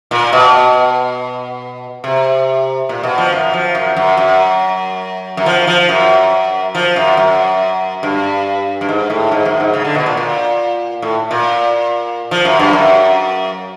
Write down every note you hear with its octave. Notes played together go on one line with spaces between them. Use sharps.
A#2
B2
C3
A#2
B2
F3
F#2
F3
F#2
F#2
F#2
F#2
F3
F3
F#2
F3
F#2
F#2
G2
G2
G#2
A2
G#2
F#2
G#2
C#3
D3
B2
A#2
A#2
A2
A#2
F3
F#2
G2
F#2